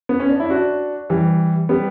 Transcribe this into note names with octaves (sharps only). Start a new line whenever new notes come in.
B3
C#4
D4
E4
D4 F#4
E3 G3
G3 B3